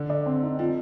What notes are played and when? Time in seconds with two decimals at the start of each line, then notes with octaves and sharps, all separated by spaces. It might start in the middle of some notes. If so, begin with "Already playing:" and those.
Already playing: D3
0.10 D5
0.26 C4
0.43 D#4
0.59 F3 C4